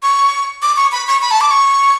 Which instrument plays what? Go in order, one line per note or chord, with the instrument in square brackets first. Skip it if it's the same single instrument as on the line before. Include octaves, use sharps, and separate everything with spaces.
[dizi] C#6
D6
C#6
B5
C#6
B5
A5
D6
C#6